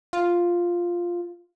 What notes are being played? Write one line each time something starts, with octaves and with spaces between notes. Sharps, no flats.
F4